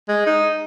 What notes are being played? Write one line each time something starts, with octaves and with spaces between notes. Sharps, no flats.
G#3
D#4